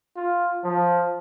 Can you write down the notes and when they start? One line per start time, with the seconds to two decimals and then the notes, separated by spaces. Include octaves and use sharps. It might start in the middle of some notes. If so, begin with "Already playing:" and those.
0.17 F4
0.64 F3